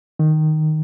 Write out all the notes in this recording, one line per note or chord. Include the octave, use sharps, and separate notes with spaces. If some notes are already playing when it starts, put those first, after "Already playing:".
D#3